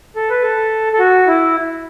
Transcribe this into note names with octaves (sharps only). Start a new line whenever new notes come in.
A4
B4
A4
A4
F#4
E4